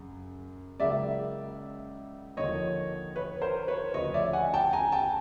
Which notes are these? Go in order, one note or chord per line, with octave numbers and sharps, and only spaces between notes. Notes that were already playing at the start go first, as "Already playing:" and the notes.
Already playing: F#2 C#3
C#2 C#3 F#3 A#3 D5 E5
D#2 D3 F3 A#3 C#5 D#5
B4 C#5
A#4 C5
B4 C#5
D2 C#3 F3 C#5 D#5
D5 E5
F#5 G#5
G5 A5
G#5 A#5
G5 A5